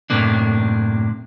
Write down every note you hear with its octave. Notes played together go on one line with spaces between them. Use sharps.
F#2 A2 C3 A#3 D4